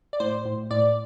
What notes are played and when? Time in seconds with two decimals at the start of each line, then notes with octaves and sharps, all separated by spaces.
0.13 D5
0.20 A2 C5
0.45 A2
0.70 A2 D5